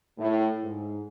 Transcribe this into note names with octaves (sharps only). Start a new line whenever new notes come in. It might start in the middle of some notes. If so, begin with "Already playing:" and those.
A2
G#2